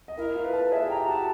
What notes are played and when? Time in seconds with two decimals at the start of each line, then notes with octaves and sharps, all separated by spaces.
0.08 D#5
0.17 E4 A#4 E5
0.35 F4 F5
0.44 B4
0.53 A4 A5
0.72 G#4 E5 G#5
0.89 G4 G5 A#5
1.07 F#4 F#5 A5